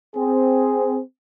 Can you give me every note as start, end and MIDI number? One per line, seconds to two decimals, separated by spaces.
0.15 1.00 60
0.15 1.00 68